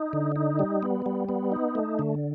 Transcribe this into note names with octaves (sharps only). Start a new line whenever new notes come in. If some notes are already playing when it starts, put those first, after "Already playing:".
Already playing: D#4
D3
D#4
G3
B3
G3
B3
D#4
A3
D3